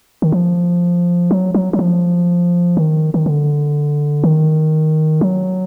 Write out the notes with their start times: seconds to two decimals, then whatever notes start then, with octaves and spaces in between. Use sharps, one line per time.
0.22 D#3
0.32 F3
1.31 F#3
1.54 F#3
1.73 F#3
1.79 F3
2.77 D#3
3.14 D#3
3.26 D3
4.24 D#3
5.21 F#3